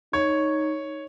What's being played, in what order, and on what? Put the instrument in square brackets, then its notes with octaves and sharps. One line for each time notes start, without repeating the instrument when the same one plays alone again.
[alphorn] D#4 [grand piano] C#5